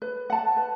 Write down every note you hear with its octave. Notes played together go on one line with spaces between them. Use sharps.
B4
F#5 A5
B4